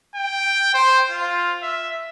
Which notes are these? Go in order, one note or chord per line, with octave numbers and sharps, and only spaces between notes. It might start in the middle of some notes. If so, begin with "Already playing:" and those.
G5
C5
F4
E5